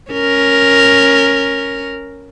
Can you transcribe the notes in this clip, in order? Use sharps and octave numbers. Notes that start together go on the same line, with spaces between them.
C#4 A#4